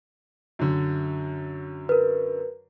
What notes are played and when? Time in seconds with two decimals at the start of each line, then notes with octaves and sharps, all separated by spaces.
0.59 F#2 D3
1.89 A#4 B4